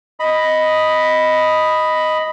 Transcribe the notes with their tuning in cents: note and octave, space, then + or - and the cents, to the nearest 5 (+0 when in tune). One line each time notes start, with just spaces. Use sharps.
D#5 +0 B5 +0